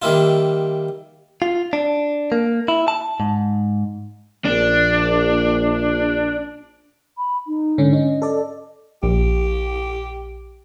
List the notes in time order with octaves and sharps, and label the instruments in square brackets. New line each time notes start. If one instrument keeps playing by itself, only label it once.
[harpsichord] D#3 G3 A#3 E4 F4
[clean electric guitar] F4
D4
A#3
E4
A5
G#2
[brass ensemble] A#1 [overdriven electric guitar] D4
[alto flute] B5
D#4
[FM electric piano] G#2 D3 C#4
[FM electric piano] C#4 [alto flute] D#5
[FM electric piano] A4 D5
[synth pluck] A#1 [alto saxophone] G4